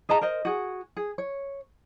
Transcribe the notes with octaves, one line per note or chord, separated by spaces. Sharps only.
G#4 D#5 A5 A#5
A#4 C5 D#5
F#4 G#4
G#4
C#5